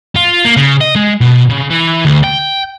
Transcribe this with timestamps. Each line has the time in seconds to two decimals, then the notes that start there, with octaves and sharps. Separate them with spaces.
0.16 F4
0.45 A#3
0.57 C#3
0.81 D#5
0.96 G#3
1.21 B2
1.50 C#3
1.70 E3
2.05 D2
2.24 G5